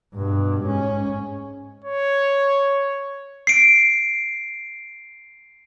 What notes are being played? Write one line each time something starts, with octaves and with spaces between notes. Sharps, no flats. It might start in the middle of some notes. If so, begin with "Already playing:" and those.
G2 B2
G#2 C#4
C#5
C7 D7